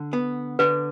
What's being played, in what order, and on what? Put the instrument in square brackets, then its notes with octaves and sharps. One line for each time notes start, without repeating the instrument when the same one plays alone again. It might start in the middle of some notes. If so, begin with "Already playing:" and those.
Already playing: [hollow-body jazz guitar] D3
B3
[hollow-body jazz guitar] D3 [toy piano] B4